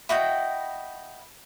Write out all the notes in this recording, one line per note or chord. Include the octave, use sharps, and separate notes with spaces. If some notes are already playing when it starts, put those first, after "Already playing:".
E4 F#4 D#5 G5